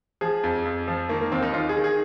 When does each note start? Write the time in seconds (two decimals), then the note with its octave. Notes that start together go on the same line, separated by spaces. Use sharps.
0.21 F3 G#4
0.44 F2
0.65 F2
0.88 F3
1.09 D#3 A#3
1.21 A#3
1.32 D#2 C4
1.43 D#4
1.54 D#2 F4
1.69 G#4
1.77 D#3
1.84 G#4